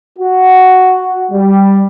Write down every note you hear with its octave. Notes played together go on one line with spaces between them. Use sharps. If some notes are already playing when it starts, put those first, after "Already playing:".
F#4
G3